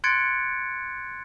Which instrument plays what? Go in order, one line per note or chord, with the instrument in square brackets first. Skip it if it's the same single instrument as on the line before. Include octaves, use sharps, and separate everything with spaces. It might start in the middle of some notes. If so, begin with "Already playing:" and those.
[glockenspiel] C6 F#6 G#6 A6 C#7 D7